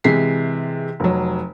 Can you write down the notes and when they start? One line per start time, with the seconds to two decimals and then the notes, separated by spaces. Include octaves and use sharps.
0.04 C3 E3 G#3 B6 C7
1.00 F1 F#3